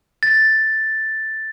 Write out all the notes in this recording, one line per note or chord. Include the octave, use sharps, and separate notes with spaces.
A6